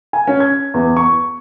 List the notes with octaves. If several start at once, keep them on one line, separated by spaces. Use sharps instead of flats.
G#5
C#4
G#6
E2
C#6